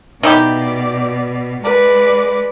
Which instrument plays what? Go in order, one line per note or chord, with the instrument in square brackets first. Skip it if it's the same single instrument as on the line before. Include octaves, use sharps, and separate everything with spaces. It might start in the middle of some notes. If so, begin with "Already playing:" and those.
[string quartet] B2 [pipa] D#4 E4 G4 [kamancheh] D5
[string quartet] G#3 [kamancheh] B4 D5